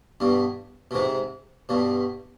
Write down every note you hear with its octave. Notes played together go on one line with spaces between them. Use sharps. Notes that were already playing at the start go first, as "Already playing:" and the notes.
G2 B2
B2
G#2 C3
G2 B2